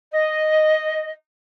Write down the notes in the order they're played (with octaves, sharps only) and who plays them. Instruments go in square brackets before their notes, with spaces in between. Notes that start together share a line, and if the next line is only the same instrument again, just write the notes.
[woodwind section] D#5